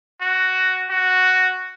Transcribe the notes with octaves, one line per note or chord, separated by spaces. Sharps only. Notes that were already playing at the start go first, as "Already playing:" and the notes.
F#4
F#4